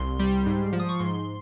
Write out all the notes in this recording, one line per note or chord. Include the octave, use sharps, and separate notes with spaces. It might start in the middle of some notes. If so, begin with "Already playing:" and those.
Already playing: C2 C6
G3
G#2
F3
D#6
C#6
G#2 C6